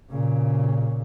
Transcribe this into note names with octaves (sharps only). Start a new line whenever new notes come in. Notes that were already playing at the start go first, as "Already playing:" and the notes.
A#2 C#3